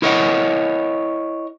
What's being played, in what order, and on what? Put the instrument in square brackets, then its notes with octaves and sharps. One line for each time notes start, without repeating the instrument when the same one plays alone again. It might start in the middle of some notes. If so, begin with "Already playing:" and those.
[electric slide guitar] E4 A#4 C#5 D#5 F#5